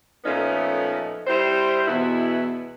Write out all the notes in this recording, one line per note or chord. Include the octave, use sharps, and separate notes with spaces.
A#2 F3 A3 B3 C#4 D#4
G3 C4 E4 C5
E2 B2 E4